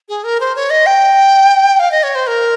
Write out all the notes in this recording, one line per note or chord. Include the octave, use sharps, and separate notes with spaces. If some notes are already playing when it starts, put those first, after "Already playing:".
G#4
A#4
C5
C#5
D#5
G5
F5
D#5
C#5
C5
A#4